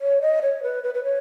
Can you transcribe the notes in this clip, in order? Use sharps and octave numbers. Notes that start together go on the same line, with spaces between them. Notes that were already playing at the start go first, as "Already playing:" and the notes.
C#5
D#5
C#5
B4
B4
B4
C#5